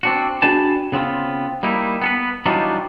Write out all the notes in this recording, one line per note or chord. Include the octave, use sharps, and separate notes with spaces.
C4 D4 F#4
D4 F#4 G#4 B4 G5 A5
C#3 B3 C4 F4
G3 A#3 D#4 E4
B3 A4 B4
E3 F#3 G3 D4 D#4 F4